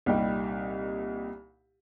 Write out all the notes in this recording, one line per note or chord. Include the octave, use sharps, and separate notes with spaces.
C2 A#2 G3 D#4 G4